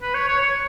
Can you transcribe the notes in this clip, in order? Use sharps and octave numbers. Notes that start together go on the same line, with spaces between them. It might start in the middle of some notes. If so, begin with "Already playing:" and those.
B4
C#5
C#5
C#5